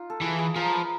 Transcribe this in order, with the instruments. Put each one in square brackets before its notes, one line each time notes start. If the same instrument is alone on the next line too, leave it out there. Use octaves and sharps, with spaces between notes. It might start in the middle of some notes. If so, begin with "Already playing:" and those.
Already playing: [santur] D#4 F4
A4
[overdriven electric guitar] E3 [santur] G#4
[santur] G#4
[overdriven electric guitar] F3 [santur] A#4
[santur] B4